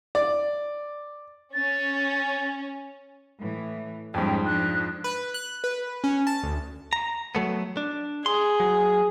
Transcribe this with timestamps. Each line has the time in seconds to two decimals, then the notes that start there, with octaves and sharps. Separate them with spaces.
0.15 D5
1.54 C#4 A6
3.40 A2 E3
4.14 F2 G#2 G3 C#4 G5
4.46 F3 D4 F#6
5.04 B4
5.34 F#6
5.64 B4
6.04 C#4
6.27 A5
6.43 D2
6.93 A#5
7.35 F#3 A3 B3
7.77 D4
8.26 G#4 C6
8.60 F#3